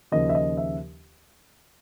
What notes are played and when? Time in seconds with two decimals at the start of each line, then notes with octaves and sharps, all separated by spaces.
0.12 D#2 C#3 F3 D#5
0.29 E5
0.35 D#5
0.57 E5